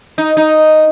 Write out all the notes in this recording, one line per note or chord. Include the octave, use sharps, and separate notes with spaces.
D#4
D#4